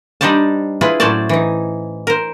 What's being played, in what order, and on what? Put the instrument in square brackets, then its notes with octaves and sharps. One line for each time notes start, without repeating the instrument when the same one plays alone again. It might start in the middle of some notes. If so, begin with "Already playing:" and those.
[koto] G3 D4 D#4 G4 C5 A5
E4 F4 G#4 B4
A2 F#3 C#4 C5 D5 A5
E3 D#4
A#4 C5